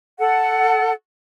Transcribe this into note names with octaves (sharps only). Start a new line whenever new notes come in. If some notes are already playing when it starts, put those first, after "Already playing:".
A4 F#5